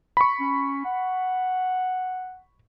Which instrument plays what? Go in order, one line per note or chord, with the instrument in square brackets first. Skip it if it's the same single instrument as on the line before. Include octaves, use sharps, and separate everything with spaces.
[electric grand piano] B5 C#6
[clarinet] C#4
F#5